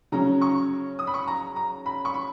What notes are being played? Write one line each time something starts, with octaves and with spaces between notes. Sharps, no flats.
C#3 F#3 C#4 A#5
C#6
D#6
B5
C#6
A#5
A#5
B5
C#6
B5